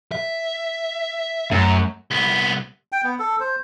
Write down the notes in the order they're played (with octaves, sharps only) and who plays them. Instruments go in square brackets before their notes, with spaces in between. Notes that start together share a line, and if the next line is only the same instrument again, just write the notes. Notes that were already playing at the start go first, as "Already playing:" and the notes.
[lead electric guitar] E5
[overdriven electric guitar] F#2 [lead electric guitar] A3
[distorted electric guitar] C2 B3
[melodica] G5
B3
A4
C5